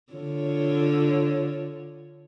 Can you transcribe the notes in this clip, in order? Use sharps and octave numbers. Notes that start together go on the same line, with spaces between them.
D3 F4 C#5